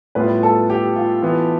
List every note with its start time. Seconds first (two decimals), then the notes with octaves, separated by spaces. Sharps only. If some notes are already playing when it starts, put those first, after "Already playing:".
0.15 A2 G3 B3 F4 B4
0.43 A4
0.70 G4
0.96 F4
1.22 E3 B3 F4